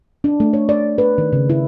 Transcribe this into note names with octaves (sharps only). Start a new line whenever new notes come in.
D4
A3
C#5
D5
B4
D#3
C#3
E4